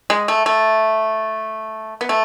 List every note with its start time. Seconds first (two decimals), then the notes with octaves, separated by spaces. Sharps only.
0.10 G#3
0.28 A3
0.46 A3
2.01 B3
2.09 A3